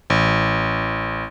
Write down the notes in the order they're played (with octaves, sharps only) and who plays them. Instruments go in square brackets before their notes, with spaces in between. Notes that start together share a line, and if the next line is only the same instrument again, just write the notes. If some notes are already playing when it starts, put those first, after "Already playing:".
[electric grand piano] A1